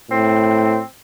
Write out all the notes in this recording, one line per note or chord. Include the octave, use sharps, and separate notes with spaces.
A2 C4